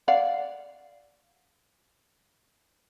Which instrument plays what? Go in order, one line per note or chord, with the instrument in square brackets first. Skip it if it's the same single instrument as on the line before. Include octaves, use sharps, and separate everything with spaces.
[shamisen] D5 F5 F#5